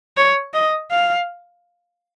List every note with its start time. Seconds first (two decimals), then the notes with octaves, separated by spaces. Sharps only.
0.17 C#5
0.54 D#5
0.91 F5